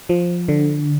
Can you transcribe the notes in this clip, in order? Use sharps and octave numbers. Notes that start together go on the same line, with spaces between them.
F3
D3